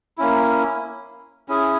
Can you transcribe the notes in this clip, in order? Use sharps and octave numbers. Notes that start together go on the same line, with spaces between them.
A#3 C#4 E4
C#4 E4 G#4